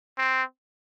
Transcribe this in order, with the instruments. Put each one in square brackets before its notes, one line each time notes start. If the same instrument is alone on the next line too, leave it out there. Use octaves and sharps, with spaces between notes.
[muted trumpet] C4